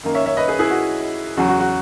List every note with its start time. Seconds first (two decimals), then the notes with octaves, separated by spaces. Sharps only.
0.03 F#2 D#3 A#3
0.14 C#5 E5
0.26 C#5 E5
0.37 B4 D#5
0.48 G#4 B4
0.59 E4 G#4
0.70 F#4
1.37 E2 C#3 F#3 F#4
1.49 F#4
1.60 F#4